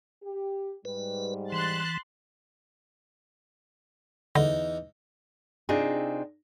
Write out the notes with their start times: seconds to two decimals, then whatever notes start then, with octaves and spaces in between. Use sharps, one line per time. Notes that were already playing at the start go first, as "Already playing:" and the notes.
0.23 G4
0.85 G#2 G3 B4
1.52 E3 C6 F#6 A6
4.35 E2 D3 D#4
5.69 C3 C4 D4 D#4 F4 G#4